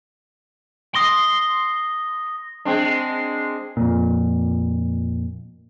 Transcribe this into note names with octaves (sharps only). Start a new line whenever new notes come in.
C6 D#6 A#6 G7
G#3 C4 D4
F2 A#2